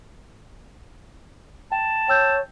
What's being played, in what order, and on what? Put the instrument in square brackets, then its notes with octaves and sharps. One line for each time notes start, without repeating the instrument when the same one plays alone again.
[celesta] G5 [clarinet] A5
[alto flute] C#5 [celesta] G5 E6 G6